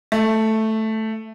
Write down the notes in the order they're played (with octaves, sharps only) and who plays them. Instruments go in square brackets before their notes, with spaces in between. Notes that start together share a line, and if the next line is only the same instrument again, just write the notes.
[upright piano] A3